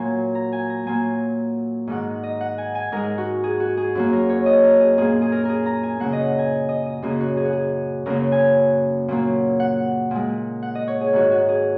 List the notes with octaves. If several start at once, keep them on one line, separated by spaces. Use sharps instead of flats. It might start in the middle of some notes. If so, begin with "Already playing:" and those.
Already playing: A#2 F#3 A#3 G#5
A#5
G#5
A#5
A#2 F#3 A#3 G#5
G#2 D#3 G#3 F#5
D#5
F#5
G#5
G#5
G#2 G#3 A#4
F#4
G#4
F#4
G#4
F#2 F#3 A#3
A#4
C#5
D#5
A#4
G#4
A#2 A#3 G#4
G#4
A#4
G#4 A#4
A#5
G#5
C#3 F#3 A#3 F#5
D#5
F#5
G#5
D#5
D#5
F#2 C#3 A#3 G#4
F#4
G#4
F#4
G#4
F#2 C#3 F#3 A#3 A#4
G#5
A#2 F#3 A#3
F#5
A#2 G#3
F#5
D#5
C#5
G#4
G#2 D#3 G#3 F#4
F#4
G#4